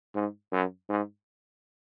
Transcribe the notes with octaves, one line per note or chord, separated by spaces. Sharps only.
G#2
F#2
G#2